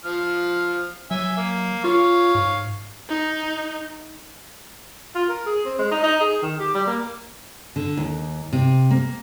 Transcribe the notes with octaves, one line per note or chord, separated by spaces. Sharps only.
F3 F6
F#3 E5 G#5
A#3
F4 C#5 F5
G#2
D#4
F4
A#4
G#4
C4
G#3
D#4
D#4
G#4
D#3
G4
G3
A#3
D3
D#2
C3
A#3